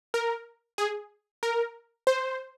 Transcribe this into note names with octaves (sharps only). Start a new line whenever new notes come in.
A#4
G#4
A#4
C5